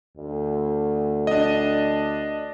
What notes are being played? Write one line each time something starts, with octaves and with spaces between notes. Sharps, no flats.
D2
D4 D#5